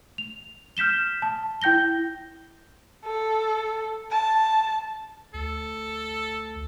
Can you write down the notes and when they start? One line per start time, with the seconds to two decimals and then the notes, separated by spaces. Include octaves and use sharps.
0.18 F7
0.77 F6 G6 B6 E7 G7
1.22 A5
1.62 E4 G5 G6 A#6 G7
3.05 A4
4.12 A5
5.34 D2 A4